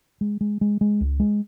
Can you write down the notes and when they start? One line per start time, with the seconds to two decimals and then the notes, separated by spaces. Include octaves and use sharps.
0.21 G#3
0.41 G#3
0.61 G#3
0.81 G#3
1.01 C#2
1.20 G#3